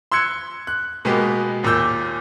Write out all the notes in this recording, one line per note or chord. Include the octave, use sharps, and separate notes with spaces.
C6 E6 F#6 G#6 C#7
F#6
B2 G#3 A#3 B3 G4
D#2 A#2 A#3 E6 G6